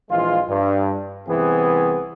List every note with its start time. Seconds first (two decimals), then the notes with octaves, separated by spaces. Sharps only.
0.11 A#1 E3 G#3 F4
0.49 G2
1.28 C2 E3 B3 C4 G#4